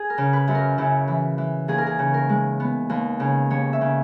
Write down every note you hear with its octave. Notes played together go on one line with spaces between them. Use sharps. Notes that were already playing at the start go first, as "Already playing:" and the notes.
Already playing: G#4
A#4
C#3
B4
F#2
A#4
C#3 E4
E3
E3
D#2 G#4
A#4
G#4
C#3
A#4
G#3
B3
D#2
C#3
D#2 C#5
E5
C#3